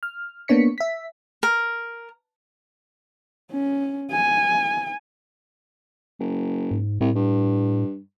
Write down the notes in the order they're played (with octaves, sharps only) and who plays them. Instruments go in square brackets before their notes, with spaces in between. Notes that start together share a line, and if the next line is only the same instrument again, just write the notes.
[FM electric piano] F6
A#3 B3 D4 C#5 B6 C#7
E5 B6
[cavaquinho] A#4
[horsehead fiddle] C#4
G#5
[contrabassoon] F#1
[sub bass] G#2
[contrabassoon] C2 [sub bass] A2
[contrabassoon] G2